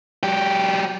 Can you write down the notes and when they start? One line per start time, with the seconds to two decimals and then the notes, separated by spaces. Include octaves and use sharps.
0.23 F#3 G4